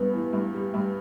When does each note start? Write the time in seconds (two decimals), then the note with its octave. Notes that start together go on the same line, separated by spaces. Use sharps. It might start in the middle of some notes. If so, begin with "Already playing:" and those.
Already playing: G2 G3 B3
0.13 E3
0.33 G2
0.54 G3
0.74 G2